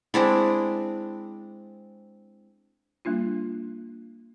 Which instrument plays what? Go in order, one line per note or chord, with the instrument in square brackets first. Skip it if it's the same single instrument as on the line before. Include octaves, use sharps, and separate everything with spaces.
[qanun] G#3 C4 D4 E4
[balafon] G3 A#3 D4 F4